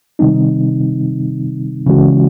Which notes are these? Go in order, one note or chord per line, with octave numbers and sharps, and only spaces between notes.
C3 D#3 G3 C4 D#4
C#3 E3 G#3 C#4 F#4